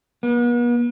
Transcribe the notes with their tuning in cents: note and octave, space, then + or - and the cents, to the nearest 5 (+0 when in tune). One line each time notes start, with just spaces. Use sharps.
B3 -45